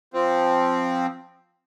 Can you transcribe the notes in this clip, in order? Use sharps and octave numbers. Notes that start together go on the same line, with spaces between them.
F3 C4